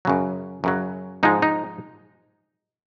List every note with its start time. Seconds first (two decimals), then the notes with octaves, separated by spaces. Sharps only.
0.05 F#2 C#3 F#3
0.64 F#2 C#3 F#3
1.23 G#2 F3 G#3 D#4
1.42 D#4